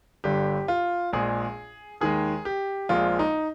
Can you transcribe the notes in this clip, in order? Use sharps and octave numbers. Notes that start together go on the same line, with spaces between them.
G1 G2 D3 G3 G4
F4
A#1 A#2 G#3 G#4
D#2 D#3 G#3 G#4
G4
A#1 A#2 F3 G#3 F4
D#4